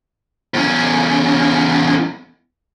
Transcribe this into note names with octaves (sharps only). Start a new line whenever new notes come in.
E2 C#4